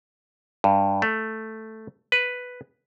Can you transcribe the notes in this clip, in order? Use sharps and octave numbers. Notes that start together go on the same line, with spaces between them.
G2
A3
B4